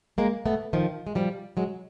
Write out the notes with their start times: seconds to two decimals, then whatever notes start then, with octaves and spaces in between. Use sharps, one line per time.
0.18 G#3 A#3
0.46 A3 B3
0.73 D#3 F3
1.07 G#3
1.15 F3 G3
1.57 F#3 G#3